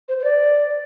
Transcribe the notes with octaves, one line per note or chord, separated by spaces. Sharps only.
C5
C5
D5